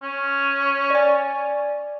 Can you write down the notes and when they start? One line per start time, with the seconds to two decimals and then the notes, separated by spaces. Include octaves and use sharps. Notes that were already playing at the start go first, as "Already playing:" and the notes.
0.03 C#4
0.90 D5 G#5